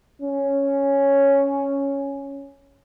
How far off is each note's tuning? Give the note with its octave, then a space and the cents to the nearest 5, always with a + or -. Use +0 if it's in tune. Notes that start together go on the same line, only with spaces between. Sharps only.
C#4 +0